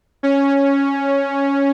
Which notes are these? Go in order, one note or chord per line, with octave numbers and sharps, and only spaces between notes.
C#4